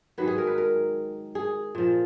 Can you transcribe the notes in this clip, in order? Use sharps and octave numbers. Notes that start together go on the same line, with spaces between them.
G#2 D#3 F#3 B4
G#4
A#4
B4
A#4
G#4
A#2 F3